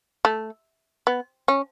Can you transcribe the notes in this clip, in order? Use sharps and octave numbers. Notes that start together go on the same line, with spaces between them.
A3
B3
C#4